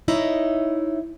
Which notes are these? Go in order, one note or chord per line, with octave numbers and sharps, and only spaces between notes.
D#4 E4 C#5 D#5